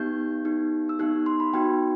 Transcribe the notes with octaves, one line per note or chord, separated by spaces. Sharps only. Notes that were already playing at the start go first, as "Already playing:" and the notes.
Already playing: B3 D#4 G4 G6
B3 D#4 G4
E6
B3 D#4 G4 F#6
C6
B5
B3 D#4 F#4 G5